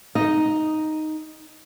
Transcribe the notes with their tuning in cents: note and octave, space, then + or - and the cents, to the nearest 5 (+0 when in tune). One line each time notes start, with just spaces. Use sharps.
D#4 +0 D#5 +0